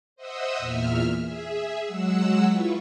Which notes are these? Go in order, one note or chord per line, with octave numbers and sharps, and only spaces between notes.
C5 D#5 E5 F#5 D#6 E6
E2 A#2 E5 F6
G#4 E5
F#3 G#3 F#5 E6
E4 F4 B4 C#6